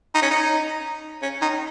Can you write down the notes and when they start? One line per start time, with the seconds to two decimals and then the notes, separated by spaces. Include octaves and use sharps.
0.15 D#4
0.22 C#4
0.31 D#4
1.22 C#4
1.42 D#4